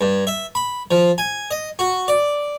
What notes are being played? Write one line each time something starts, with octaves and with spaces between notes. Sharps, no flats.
G2
E5
B5
F3
G#5
D#5
F#4
D5